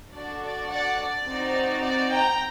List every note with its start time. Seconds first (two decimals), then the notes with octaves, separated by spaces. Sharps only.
0.13 D4 F#4 A4 D5
0.41 D5
0.70 D5 F#5
0.98 D5
1.26 C4 D#4 F#4
1.82 D5
2.10 G5 A#5